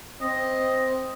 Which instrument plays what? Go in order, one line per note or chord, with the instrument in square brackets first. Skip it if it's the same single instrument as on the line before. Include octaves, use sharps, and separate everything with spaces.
[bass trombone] C4 [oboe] D#5